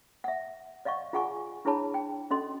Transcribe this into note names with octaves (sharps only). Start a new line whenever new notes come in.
E5 F#5
D5 D#5 F5 F#5 C#6
F4 G#4 F#5 G#5 C#6
D4 E4 G#4 C#5 A5 B5
G5
C#4 F#4 A4 D#5 C6